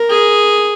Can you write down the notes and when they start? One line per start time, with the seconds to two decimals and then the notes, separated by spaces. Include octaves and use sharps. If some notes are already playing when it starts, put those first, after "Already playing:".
Already playing: A#4
0.09 G#4